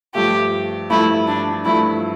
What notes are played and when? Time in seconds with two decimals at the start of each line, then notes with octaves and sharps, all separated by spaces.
0.15 G2 F3 A3 G4
0.90 G2 F3 A3 E4
1.28 D4
1.66 G2 F3 A3 E4